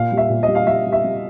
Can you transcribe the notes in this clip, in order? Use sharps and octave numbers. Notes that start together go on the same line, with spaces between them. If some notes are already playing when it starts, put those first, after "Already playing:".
Already playing: A#2 F5
G3
E5
A#2
D#5
G3
F5
G3 E5
G3
E5
G3